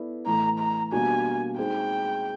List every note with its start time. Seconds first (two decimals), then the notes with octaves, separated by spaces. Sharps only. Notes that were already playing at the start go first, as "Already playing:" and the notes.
Already playing: B3 E4 A4 D5
0.26 A2 E3 A3 A#5
0.59 A#5
0.92 B2 G3 A#3 D4 F#4 G#5
1.58 G#3 C4 D#4 G#4 G5